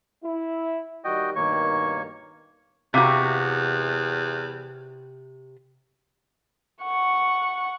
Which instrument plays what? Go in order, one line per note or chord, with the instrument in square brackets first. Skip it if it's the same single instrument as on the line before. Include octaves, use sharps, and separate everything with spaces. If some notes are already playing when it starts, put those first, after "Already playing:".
[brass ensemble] E4
[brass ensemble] D#3 G3 [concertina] F#4 D#5 G5
[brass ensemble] G2 B2 D#3 [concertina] A#3 C#5 C#6
[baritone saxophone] E2 [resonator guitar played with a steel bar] C3 F#4 [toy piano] F5 G5 D6
[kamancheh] F#5 C#6